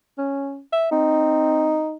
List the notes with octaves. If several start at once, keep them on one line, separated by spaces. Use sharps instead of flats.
C#4
E5
C4 D#4